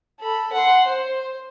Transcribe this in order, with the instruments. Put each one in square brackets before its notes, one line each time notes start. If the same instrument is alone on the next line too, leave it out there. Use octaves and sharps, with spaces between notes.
[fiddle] A4 B5
F#5 C6
C5